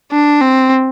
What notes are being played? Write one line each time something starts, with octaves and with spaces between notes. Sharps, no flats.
D4
C4